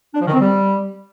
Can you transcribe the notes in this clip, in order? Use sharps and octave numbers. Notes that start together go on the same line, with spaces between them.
D4
F3
D#3
C4
G3